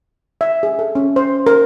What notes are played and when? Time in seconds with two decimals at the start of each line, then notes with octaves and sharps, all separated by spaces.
0.41 E5
0.63 G#4
0.79 A4
0.95 C#4
1.16 C5
1.47 A#4